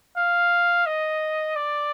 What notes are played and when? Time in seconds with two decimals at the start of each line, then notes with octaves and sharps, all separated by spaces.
0.17 F5
0.86 D#5
1.56 D5